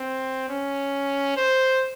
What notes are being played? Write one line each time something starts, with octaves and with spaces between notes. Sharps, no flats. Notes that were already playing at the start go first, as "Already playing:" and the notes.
Already playing: C4
C#4
C5